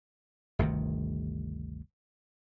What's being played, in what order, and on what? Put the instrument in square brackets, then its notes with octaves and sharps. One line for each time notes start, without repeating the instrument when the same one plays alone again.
[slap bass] G1 D2 C3 D#3